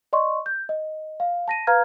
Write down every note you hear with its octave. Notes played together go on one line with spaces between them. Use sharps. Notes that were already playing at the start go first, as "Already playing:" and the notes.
D5 D#5 C6 C#6
G6
D#5
F5
A5 A#6 D#7
B4 F5 A#5 F6 G#6